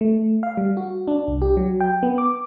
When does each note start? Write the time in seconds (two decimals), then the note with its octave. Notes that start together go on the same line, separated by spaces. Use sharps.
0.01 A3
0.43 F5
0.57 G3
0.77 F#4
1.08 D4
1.27 C2
1.42 G4
1.57 F#3
1.80 G5
2.03 B3
2.18 D6